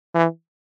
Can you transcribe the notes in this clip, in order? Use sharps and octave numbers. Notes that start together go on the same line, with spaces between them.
E3